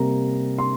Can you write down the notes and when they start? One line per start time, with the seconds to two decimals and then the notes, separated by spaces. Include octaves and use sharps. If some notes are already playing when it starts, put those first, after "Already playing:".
Already playing: C3 G3 A#3 A#5
0.58 C6